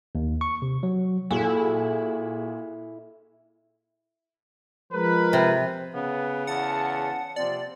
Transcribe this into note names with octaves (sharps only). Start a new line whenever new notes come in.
D#2
C#6
C3
F#3
A#2 E4 F#4 G#4 A4
F3 G#3 A#4 B4
C3
C#3 B3
E2 F#5 A5
C3 F3 A#3 C4 D5